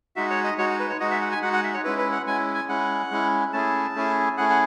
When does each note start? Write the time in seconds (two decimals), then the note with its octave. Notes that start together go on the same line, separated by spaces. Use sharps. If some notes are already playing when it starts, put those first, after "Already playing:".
0.16 G#3 D#4 F#4 E5
0.30 C#5
0.44 D#5
0.58 G#3 D#4 F#4 C#5
0.79 B4
0.90 C#5
1.00 G#3 D#4 F#4 D#5
1.11 E5
1.21 F#5
1.32 G#5
1.42 G#3 D#4 F#4 F#5
1.53 F#5
1.63 E5
1.74 C#5
1.85 G#3 C#4 E4 B4
1.98 B4
2.12 F#5
2.26 G#3 C#4 E4 G#5
2.55 G#5
2.69 G#3 C#4 E4 F#5
3.11 G#3 C#4 E4
3.53 A3 C#4 E4 G#4 A5
3.95 A3 C#4 E4 G#4
4.37 A3 C#4 E4 G#4 F#5
4.50 F#5